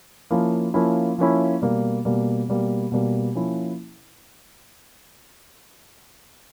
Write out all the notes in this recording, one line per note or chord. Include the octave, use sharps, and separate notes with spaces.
F3 A#3 C#4 E4
F3 A#3 C#4 E4
F3 A#3 C#4 E4
B2 G3 A#3
B2 G3 A#3
B2 G3 A#3
B2 G3 A#3
F3 A#3 C#4 E4